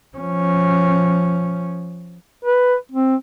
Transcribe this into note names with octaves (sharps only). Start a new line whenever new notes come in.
F3 C#4
B4
C4